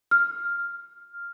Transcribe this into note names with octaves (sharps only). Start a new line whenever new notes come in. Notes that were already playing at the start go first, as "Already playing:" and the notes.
F6